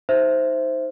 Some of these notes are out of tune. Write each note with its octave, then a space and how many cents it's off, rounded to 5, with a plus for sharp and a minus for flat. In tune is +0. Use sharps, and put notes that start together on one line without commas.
D#4 +25 C5 +0 E5 +0